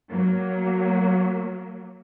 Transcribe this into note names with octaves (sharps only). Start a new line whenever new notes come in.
F#3 A#3